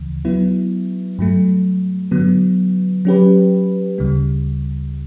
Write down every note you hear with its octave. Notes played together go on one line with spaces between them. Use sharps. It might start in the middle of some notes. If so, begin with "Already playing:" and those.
Already playing: D2 C#3 E3
F#3 B3 E4
G2 F#3 A3
D3 F#3 B3
F#3 C#4 G4 B4
D2 C#3 G3